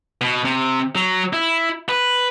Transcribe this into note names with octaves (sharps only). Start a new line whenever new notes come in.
B2
C3
F#3
E4
B4